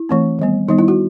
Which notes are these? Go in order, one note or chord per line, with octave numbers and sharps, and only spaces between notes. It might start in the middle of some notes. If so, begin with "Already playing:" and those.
Already playing: E4
E3 A3 C4
D#3 G3 B3
D#3 G3 B3 D#4
E4
F#4